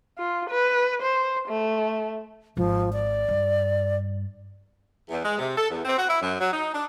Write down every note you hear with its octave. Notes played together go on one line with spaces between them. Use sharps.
F4
B4
C5
A3
G#1 F3
D5
G2
E2
G#3
C3
A4
E2
C4
F#4
E4
F#2
F#3
D#4
D4